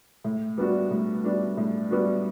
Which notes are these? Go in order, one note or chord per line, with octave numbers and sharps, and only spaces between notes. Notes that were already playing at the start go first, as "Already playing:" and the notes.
A2
G3 B3 D4 F#4
A2
G3 B3 D4 F#4
A2
G3 B3 D4 F#4